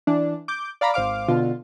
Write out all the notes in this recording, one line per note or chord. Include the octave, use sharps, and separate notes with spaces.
E3 D4
D6 G6
D5 F5 A#5 B5
G#1 C5 F5 D6
B2 D3 F4